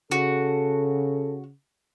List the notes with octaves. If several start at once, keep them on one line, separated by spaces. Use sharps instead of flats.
C#3 F#4 A4